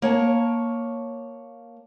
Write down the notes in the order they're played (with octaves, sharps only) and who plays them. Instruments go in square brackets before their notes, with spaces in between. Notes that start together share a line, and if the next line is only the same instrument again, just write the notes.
[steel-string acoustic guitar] A#3 C#5 G#5 A5